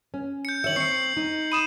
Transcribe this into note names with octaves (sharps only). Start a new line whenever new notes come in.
C#4
G6 C#7
D#3 C#5 E5 C#7 F#7
C4 C#6 C7 C#7
D#4
B5 D#6 D#7 E7